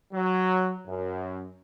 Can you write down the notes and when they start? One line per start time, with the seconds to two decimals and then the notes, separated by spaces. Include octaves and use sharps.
0.13 F#3
0.87 F#2